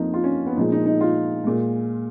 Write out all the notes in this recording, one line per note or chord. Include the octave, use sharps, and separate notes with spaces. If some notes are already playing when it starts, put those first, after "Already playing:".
Already playing: F2 F3 A#3 D#4
F4
C#4
B3
A#2 F3 G#3 D#4
D#4
D#4
F4
A#2 G#3